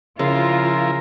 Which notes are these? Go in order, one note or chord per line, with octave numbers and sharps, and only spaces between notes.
C#3 F3 E4 F4 A#4